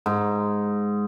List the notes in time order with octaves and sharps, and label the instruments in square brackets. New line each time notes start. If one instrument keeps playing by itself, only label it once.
[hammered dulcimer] G#2